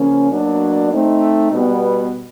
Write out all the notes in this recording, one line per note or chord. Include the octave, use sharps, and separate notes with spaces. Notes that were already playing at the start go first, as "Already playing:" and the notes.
Already playing: C#3 F3 A#3 C#4
B2 F#3 A#3 D4
A3 C4 D#4
B2 G3 B3